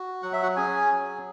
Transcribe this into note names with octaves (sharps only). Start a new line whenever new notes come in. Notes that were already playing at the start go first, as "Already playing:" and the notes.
Already playing: F#4
F#3 F#5
E5
F#4 F#5
C#4 G#4 G#5
F#3